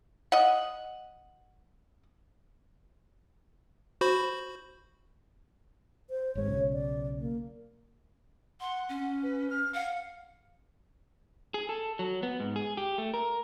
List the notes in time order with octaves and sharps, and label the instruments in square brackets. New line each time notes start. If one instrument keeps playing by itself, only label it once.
[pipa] D#5 F#5
[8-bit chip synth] F#4 C5 B5
[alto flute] C5
[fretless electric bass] G#1 G#3 [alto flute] C#5
[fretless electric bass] B1 C#3
[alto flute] D5
A#3
[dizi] F#5 [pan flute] C6
[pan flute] C#4
[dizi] B4
F6
[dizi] F5 [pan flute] F#5
[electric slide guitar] G#4
A4
F#3
B3
G#2
G#4
G4
A3
A#4